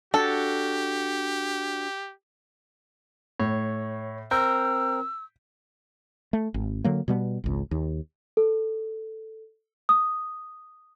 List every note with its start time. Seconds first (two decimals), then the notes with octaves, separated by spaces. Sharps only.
0.14 D4 F#4 G4 A4
3.40 A2 C#5
4.31 C4 A#4 E6 G6
6.33 A3
6.54 G#1
6.84 D3 F#3 A#3
7.08 B2 G3 B3
7.44 G#1 C#2
7.71 D#2
8.37 A4
9.89 D#6